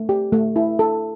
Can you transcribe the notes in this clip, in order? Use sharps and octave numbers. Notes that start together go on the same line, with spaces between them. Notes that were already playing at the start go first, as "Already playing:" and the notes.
Already playing: A3
G4
A3
E4
A4